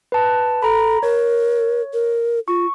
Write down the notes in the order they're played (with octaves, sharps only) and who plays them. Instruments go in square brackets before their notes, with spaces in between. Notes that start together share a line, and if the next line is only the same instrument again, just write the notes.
[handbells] B4 A5
[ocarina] A4 [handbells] A#5 B5
[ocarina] A#4 [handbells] C#5
[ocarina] A#4
[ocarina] F4 [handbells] C#6